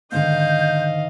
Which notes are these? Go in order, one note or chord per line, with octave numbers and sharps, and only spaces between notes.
G#2 D3 D#3 D#5 F5 G6